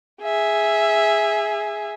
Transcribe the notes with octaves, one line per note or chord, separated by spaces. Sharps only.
G#4 E5